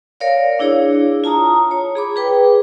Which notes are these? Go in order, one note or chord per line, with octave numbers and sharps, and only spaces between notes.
A#4 C#5 D5 F5
D4 E4 G#4 C#5
F4 A5 A#5 D#6
C#5
G#4 B5 D6
G#4 B4 G5